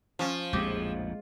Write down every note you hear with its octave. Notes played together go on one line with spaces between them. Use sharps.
F3 C#4 F5
A#1 F2 A2 G#3 C4 G4 D#5